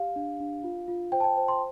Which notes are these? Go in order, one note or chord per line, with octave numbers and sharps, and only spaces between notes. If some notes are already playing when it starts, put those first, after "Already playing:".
Already playing: G4 F5
D4
D4
F4
F4
C5 G5
A5
G5
C5
C6